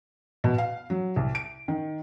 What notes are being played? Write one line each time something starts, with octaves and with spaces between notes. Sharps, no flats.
B2
F5
F#3
C2
D7
D#3